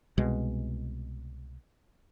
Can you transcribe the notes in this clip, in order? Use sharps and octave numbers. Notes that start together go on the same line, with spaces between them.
C2 B2 G#3